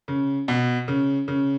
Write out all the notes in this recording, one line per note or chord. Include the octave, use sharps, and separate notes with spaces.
C#3
B2
C#3
C#3